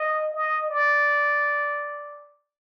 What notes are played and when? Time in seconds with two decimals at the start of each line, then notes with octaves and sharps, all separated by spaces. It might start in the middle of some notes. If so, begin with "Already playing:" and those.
Already playing: D#5
0.34 D#5
0.69 D5